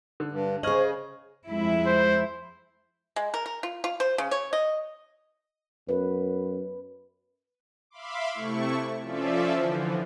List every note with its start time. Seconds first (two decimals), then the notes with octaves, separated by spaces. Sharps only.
0.20 D3
0.32 G2
0.63 C#3 G#4 C5 D#5 C#6 F6 G#6 F#7
1.47 F2 G#3 E4
1.87 C5
3.16 G#3
3.34 A#4
3.46 A#4
3.63 F4
3.84 F4
4.00 C5
4.18 C#3
4.31 C#5
4.53 D#5
5.89 F#2 B4
7.90 E5 F5 B5 C6 D6
8.32 C3 A3 E4 C#6
9.02 F3 C#4 F4 A4 D5 E5
9.53 D3 E3 F3